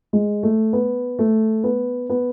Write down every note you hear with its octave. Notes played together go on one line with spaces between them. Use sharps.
G#3
A3
B3
A3
B3
B3